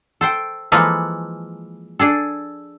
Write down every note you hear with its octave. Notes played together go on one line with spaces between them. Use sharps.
A4 C5 G5
E3 F3 G#3 A#3 A4 B4
D4 G#4 A4